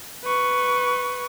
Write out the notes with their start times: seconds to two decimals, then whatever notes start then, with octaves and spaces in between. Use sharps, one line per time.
0.25 B4 C#6